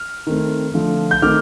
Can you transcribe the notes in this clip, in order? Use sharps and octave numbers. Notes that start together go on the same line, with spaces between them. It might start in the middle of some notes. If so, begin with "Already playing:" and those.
Already playing: F6
D#3 A3 C4
D3 F3 A3
G6
D#3 A3 C4 D#4 D6 F6